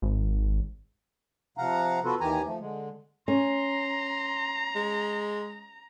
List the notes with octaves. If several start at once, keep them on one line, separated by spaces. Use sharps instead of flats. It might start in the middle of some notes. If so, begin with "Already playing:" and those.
G#1
C3 F3 F5 F#5 A#5
B3 F4 F#4 A4 B4
D#2 D#3 E3 G4 G#5 A#5
F3 A3
D3 G#3
C#4 A#5 C6
G#3